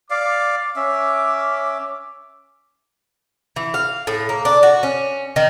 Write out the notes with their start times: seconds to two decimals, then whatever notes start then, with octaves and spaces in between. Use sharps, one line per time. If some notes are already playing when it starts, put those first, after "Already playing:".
0.10 D5 F5 D6
0.76 C#4 E5
3.56 E3
3.74 F5
4.07 A2
4.29 A#3
4.45 D4
4.63 F#4
4.83 C#4
5.36 D#3